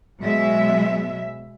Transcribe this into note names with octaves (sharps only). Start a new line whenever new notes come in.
B2 F#3 G#3 E5